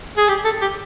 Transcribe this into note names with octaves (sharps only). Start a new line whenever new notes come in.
G#4
G4
A4
G4